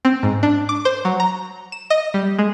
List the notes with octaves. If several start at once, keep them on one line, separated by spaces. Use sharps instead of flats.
C4
G#2
D4
D6
C5
F#3
A#5
E7
D#5
G3
G#3